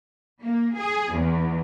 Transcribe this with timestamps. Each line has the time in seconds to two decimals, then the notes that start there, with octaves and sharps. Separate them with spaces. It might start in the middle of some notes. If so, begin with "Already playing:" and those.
0.42 A#3
0.76 G#4
1.14 E2